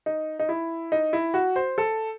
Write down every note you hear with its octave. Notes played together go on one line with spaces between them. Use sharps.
D#4
D#4
E4
D#4
E4
F#4
C5
A4